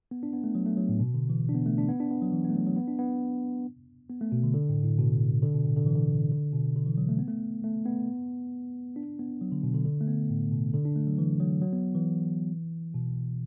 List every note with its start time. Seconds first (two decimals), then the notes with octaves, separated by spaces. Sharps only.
0.11 B3
0.23 D4
0.33 B3
0.44 A3
0.55 F#3
0.66 A3
0.77 F#3
0.89 A2
1.00 B2
1.14 D3
1.29 E3
1.49 D4
1.55 B3
1.66 A3
1.78 D4
1.89 B3
2.00 D4
2.11 B3
2.22 F#3
2.32 E3
2.44 B3
2.50 A3
2.55 F#3
2.66 F#3
2.76 B3
2.88 D4
2.99 B3
4.10 B3
4.21 A3
4.32 B2
4.43 D3
4.54 D3
4.69 A2
4.83 A2
4.98 B2
5.42 D3
5.54 B2
5.65 A2
5.76 D3
5.86 E3
5.96 D3
6.31 D3
6.53 B2
6.76 D3
6.86 E3
6.98 F#3
7.09 A3
7.19 B3
7.28 A3
7.64 A3
7.86 B3
8.96 D4
9.19 B3
9.42 F#3
9.52 D3
9.63 B2
9.74 D3
9.85 D3
10.01 A3
10.07 B3
10.30 A2
10.52 B2
10.74 D3
10.85 D4
10.96 A3
11.07 F#3
11.18 E3
11.40 F#3
11.62 F#3
11.73 B3
11.95 E3
12.95 B2